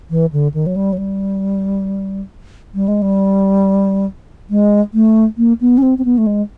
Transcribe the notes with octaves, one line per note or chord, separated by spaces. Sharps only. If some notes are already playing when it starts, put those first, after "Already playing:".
E3
D3
D#3
F#3
G3
F#3
G3
G3
G#3
G3
G#3
A3
A#3
B3
C#4
C4
C4
B3
A3
G#3